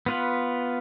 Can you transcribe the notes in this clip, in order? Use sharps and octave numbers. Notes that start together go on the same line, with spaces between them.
B3 F4 B4